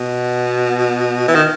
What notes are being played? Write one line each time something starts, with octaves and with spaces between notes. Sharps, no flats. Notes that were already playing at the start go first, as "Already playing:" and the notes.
Already playing: B2
E3
D#3